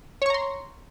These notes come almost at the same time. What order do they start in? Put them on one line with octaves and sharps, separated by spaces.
C#5 C#6 A#5 C6